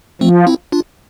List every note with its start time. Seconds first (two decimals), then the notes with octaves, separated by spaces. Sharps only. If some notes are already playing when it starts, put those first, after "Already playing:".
0.21 F3 A3 C4
0.47 C4 E4
0.72 D4 F4